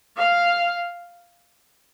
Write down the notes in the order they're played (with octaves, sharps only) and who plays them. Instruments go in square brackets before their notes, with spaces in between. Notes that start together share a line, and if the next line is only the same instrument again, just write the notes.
[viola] F5